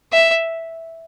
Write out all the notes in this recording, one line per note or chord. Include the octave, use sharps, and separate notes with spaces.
E5